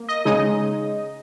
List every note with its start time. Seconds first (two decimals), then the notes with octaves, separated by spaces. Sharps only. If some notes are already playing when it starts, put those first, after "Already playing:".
Already playing: A#3
0.09 D#5
0.25 C#3 G#3 D#4 D#5